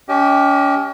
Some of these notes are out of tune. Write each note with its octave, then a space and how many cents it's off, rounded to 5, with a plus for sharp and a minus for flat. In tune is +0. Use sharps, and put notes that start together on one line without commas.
C#4 +35 G4 +0 D#5 +45